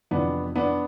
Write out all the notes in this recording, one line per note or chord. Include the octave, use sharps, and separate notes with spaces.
F2 C3 E3 B3 D4
B3 D4